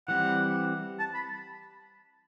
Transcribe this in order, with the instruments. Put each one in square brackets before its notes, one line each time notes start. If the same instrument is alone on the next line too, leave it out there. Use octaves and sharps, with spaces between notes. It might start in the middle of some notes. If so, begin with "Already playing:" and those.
[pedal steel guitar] E3 G3 C4 [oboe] F#5
[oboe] A5
B5